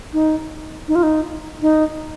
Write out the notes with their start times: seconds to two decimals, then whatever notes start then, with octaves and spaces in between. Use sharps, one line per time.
0.13 D#4
0.88 D#4
0.95 F4
1.03 D#4
1.62 D#4